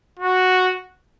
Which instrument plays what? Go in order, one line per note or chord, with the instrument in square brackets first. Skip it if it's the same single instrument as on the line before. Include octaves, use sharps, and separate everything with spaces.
[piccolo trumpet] F#4